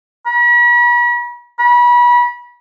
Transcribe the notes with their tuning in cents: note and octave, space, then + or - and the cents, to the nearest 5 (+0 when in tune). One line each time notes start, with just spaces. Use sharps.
B5 -45
B5 -30